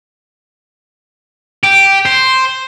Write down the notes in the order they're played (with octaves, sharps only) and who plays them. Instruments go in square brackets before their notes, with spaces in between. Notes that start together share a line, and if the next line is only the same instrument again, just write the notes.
[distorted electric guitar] G4
C5